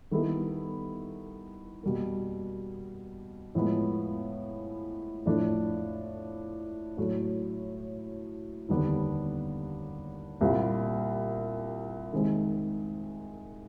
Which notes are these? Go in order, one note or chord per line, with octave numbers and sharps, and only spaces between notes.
D#3 G3 B3 E4 A4
B2 G3 A#3
A2 F3 G#3 B3
A2 F3 A3 D4
A2 F#3 A3
D#2 D3 G3 B3 D4
C2 A#2 G3 C4 F4
C3 D#3 G#3 C4 D#4